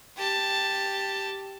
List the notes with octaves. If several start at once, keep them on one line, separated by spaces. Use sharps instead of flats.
G4 A5